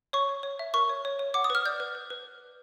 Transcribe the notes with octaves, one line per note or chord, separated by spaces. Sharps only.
C#5 C#6
C#5
C#5
E5
A#4 C#6
C#5
C#5
C#5
F#5 D6
D#6
B4 F6
D5 G6
B4
B4
B4